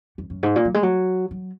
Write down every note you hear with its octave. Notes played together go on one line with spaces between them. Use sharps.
F2
F#2
G#2
A#2
F#3
G#3
F#3
F#3